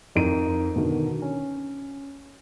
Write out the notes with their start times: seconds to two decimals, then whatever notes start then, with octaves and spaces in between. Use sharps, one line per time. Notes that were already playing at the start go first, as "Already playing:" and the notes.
0.15 F2 D#4 A#4 D7 D#7
0.76 B2 D3 D#3
1.22 C#4